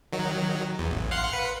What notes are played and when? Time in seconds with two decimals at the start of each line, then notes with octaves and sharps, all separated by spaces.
0.12 D#3 F#3
0.79 E2
0.91 A1
1.11 F5 F#5 C6
1.32 B4 C#7